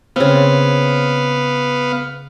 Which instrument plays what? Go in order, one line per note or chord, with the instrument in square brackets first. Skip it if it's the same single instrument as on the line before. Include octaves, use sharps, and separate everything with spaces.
[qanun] C#3 C4 [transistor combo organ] B3 F5